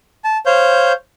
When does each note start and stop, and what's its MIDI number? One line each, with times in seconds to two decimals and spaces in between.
0.24 0.38 81
0.46 0.92 72
0.46 0.92 73
0.46 0.92 77
0.46 0.92 91